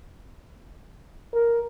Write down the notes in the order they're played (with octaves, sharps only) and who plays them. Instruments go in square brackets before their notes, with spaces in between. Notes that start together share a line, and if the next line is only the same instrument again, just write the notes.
[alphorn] A#4